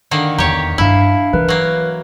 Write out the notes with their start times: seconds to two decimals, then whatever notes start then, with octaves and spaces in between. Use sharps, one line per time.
0.11 D3 D#3 A#3
0.38 E2 G4 C#5 A#5
0.78 G2 C#4 D4 E4 F5
1.33 E3 A#4 B4
1.48 F#3 A#3